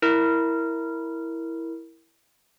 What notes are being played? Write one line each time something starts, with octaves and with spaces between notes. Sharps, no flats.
E4 A#4